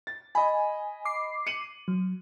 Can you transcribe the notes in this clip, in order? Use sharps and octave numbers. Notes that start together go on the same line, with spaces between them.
A6
D#5 G#5 B5
D6 C7
C#7 D#7 F#7
F#3